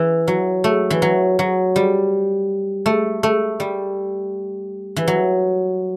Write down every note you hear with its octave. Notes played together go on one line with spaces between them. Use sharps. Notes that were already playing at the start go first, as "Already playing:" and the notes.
Already playing: E3
F#3
A3
E3
F#3
F#3
G3
A3
A3
G3
E3
F#3